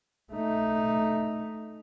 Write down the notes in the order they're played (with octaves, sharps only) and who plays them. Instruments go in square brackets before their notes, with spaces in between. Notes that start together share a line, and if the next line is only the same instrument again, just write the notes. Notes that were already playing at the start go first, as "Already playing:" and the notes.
[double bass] A3 D#4